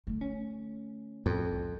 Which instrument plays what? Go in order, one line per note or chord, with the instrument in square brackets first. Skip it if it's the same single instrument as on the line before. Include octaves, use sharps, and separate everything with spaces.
[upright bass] D3 A3
[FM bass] C#4
[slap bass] F2 [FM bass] A2
[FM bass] C2